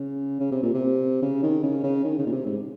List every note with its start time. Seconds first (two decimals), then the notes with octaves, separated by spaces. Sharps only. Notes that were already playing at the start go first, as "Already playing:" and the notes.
Already playing: C#3
0.40 C#3
0.52 C3
0.63 A#2
0.74 C3
1.22 C#3
1.43 D#3
1.63 C#3
1.83 C#3
2.04 D#3
2.18 C#3
2.26 A#2
2.32 C3
2.46 G#2